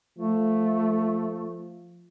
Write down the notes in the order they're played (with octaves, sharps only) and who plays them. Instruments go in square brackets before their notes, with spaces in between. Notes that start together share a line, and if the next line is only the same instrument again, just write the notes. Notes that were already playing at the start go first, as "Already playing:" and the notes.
[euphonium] F3 [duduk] A3